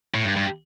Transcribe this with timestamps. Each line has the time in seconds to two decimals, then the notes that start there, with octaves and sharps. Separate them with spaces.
0.14 A2
0.25 G2
0.37 G2